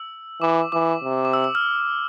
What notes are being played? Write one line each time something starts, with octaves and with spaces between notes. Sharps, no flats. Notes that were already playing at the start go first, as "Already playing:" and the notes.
Already playing: E6
E3 D6
E3 D6
C3
D6
E6
E6
F6